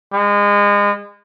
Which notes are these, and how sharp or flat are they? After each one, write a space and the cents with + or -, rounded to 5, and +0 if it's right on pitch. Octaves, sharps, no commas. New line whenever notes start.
G#3 -30